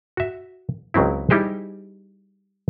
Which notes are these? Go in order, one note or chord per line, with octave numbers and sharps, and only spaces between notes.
F#4 E5
C#2 C#3 F#3 C4 E4
G3 D#4 E4 G4 G#4 C5